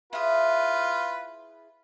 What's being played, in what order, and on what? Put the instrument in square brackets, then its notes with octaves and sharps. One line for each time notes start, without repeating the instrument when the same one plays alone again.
[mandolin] E4 G#4 [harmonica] F4 B4